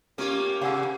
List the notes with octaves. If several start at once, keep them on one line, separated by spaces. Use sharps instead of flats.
A3 A#3 C#4 F4 G4
C3 C#4 G#4 C5 F5 F#5 E6